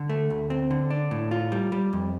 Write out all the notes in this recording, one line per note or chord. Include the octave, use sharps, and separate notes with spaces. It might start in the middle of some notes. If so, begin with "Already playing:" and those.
Already playing: D3
A3
D2
C4
D3
D4
A2
F4
G3
G3
F2